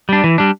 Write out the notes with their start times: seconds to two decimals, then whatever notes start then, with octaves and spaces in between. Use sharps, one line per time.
0.09 G3 D4
0.24 E3
0.38 G3 D4